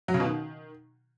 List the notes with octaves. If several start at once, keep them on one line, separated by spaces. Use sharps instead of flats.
F#3
C#3
B2
D#3